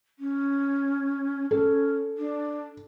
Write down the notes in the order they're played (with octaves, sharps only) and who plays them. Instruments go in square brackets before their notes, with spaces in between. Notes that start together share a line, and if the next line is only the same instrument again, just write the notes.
[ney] C#4
[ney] C#4 [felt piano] A4
[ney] D4